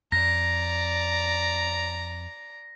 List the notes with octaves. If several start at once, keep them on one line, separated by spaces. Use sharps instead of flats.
F2 D5 A#5 A#6